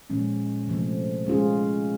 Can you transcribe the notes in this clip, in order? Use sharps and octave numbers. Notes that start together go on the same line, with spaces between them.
A#2 F3 G#3 C#4
C3 F3 A3
G#3 C#4 F4 G#4